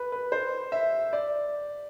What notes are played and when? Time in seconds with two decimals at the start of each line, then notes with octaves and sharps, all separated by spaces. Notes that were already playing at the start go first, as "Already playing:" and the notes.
Already playing: B4
0.12 B4
0.32 C5
0.72 E5
1.13 D5